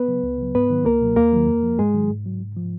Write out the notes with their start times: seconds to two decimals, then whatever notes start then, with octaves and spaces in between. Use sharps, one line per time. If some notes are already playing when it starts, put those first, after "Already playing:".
Already playing: B3 B4
0.08 C#3 F#3
0.23 C#2
0.38 C#3 F#3
0.54 G#2 B3 B4
0.70 D#3 F#3
0.85 C#2 A#3 A#4
1.01 B2 F#3
1.16 D#2 A#3 A#4
1.33 D#3 F#3
1.47 F2
1.63 F3
1.79 G#2 G#3 G#4
1.94 D#3 F#3
2.10 G#2
2.26 F#3
2.41 G#2
2.57 F3